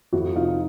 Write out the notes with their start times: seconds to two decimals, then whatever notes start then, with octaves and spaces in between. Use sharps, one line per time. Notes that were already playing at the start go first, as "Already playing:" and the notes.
0.13 F2 E4 F#4
0.35 C3 F3 D#4 F4